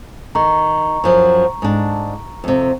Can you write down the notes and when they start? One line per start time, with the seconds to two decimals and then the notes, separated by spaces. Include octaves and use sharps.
0.35 D#3 A#5 C#6
1.04 F#2 F3 F#3
1.62 G#2 D4
2.44 F2 C3